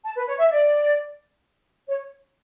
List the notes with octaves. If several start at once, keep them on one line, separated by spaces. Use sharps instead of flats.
A5
B4
C#5
E5
D5
C#5